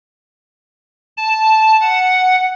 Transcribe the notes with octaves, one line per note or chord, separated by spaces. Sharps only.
A5
F#5